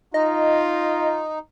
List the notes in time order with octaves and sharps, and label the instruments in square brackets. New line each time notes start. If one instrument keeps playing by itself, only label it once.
[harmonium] D#4 [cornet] F4 [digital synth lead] D#5